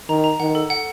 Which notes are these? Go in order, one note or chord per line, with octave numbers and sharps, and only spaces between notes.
D#3 A#5
A#5
D#3 F#5
A4
F#5